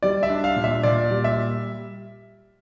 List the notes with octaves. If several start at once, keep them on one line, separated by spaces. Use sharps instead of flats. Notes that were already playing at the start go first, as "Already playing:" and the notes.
G3 D5
E5
D4
F5
A#2
E5
A#2 D5
G3
E5